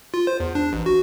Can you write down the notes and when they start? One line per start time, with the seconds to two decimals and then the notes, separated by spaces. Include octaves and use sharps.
0.14 F4
0.27 C5
0.40 E2
0.55 D4
0.73 A1
0.86 F#4